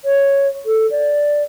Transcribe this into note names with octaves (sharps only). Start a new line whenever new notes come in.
C#5
A4
D5